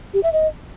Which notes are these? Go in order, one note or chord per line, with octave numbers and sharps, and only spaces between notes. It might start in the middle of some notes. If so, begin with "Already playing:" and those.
G4
E5
D#5